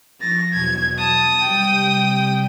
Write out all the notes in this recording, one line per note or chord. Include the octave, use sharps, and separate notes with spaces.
F3 C#6 A6 A#6
E2 B2 F#3 G#6
A5 D#6
C3 G3 G5